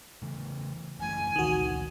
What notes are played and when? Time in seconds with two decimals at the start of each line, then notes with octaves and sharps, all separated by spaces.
0.22 C#3 E3 A3
0.99 F#1 E3 A3 G#5
1.36 G1 C#2 D#3 F#4